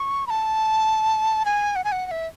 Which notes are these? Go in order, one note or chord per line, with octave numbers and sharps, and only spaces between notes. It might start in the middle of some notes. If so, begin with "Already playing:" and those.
Already playing: C#6
B5
A5
G#5
F#5
G#5
F#5
F#5
E5